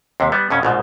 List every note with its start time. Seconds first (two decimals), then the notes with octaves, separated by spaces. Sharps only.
0.20 D#2 C3
0.32 G3 B3
0.50 F2 B2 C#4
0.63 A#1 G#2 B2